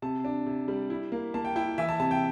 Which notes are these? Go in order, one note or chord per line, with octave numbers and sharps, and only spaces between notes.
C3 A5
D4
C3
G3
E4
A#3
A#3 A5
G5
E4 G5
E3 E5
A5
C3 A5
G5